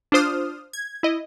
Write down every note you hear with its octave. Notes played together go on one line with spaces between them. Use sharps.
D4 F4 C5 D#6 F6
G#6
E4 D#5